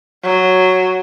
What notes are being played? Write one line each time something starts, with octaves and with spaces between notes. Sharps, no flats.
F#3